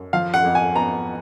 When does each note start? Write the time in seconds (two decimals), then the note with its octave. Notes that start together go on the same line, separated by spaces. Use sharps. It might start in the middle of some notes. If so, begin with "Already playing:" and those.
Already playing: F#2
0.13 F3 F5
0.34 F#5
0.45 F2
0.55 G#5
0.75 B3 A#5